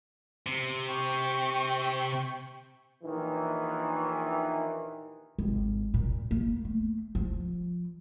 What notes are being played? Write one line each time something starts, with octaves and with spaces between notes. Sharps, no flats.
C3
G5 C#6
A#1 D#2 D#3 E3
G#1
A#2
A#3
A3
F3